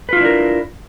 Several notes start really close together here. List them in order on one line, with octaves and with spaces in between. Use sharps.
B4 F4 E4 D4 A#4